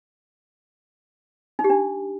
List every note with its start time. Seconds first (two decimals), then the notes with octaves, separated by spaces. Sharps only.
1.59 D#4
1.64 G4
1.70 D4